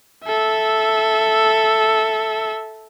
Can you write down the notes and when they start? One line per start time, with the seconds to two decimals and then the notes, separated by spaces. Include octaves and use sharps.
0.24 A4 E5